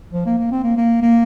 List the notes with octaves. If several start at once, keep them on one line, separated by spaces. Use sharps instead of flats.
F3
A#3
A#3
C4
A#3
A#3
A#3